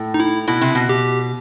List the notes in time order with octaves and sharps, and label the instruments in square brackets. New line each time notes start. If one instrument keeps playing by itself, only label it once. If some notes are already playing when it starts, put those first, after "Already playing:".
Already playing: [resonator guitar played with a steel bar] A2
[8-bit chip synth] D#4
E4
[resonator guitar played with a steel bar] B2 [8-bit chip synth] E4
[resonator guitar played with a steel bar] C3
B2
[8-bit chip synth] G4